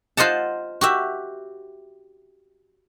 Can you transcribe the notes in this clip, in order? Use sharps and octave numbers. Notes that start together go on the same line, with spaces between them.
F4 C5 D#5 F#5 A5
F#4 G4 E5